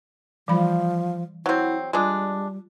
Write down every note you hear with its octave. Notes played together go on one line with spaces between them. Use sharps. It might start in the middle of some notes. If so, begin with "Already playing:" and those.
E3 F3 G3 B5
F#3 C4 E4 F#5
G3 G#3 D4 F4